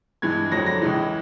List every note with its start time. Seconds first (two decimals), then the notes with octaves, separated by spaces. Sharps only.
0.22 G2 E3 G#3 G#6
0.52 F2 D3 F#3 A#6
0.66 A#6
0.82 C#2 C#3 E3